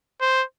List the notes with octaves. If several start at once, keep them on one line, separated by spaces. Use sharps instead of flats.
C5